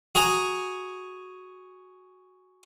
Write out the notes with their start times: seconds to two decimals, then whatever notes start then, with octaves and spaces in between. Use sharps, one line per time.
0.15 F#4 G#4 G#5 A#5